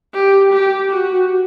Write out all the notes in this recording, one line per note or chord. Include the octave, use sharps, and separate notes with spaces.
G4
G4
F#4